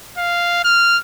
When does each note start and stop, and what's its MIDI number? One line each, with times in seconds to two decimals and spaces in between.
0.18 0.62 77
0.64 0.98 89